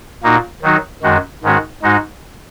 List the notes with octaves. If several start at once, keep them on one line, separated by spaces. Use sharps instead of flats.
A#2 A#3 D#4 F#4
D#3 F#3 D#4 F#4
F#2 D#3 G#3 F#4
G#2 D#3 G#3 C#4 F#4
G#2 G#3 D#4 F#4